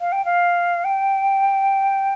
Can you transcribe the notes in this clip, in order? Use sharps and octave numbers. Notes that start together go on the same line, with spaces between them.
F5
G5
F5
G5